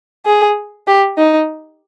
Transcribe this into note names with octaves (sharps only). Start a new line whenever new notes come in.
G#4
G4
D#4